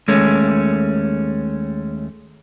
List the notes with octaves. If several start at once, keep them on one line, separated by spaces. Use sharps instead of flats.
D#2 G#3 A3 C#4